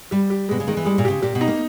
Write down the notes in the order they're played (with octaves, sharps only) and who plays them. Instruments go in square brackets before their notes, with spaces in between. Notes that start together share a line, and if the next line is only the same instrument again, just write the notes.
[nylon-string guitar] G3 [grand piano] G4
[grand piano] G4
[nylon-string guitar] B2 [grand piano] G#3
[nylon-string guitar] C#3
[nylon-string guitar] D#3 [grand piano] G#3
[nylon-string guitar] E3
[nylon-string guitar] G3 [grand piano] G#3
[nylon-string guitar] A#2
[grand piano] G4
[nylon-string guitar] C#3
[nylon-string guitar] A#2 [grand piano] G4
[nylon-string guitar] B2
[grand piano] D#4
[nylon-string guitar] A#3